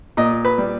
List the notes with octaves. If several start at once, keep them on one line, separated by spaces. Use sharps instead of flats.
A#2 D#5
B4
G3